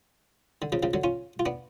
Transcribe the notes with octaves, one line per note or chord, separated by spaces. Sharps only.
D3
C#3 F3
C#3 F3
D3 F#3
C#4 F4
F4
B3 D4